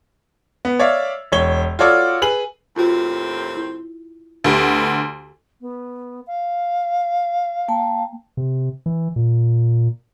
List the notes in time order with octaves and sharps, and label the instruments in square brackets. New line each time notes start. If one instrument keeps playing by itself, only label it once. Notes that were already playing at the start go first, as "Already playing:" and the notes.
[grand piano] B3
C#5 D5 E5 F5
E1 C#5 G7
F4 F#4 A4 C#5 D5
G#4 B4 F#7
[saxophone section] D#2 A2 C4 [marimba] F4 F#4
[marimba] E4
[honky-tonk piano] D2 [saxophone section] A2 A3 B3 [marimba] G4
[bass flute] B3
F5
[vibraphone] A#3 G5 A5
[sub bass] C3
E3
A#2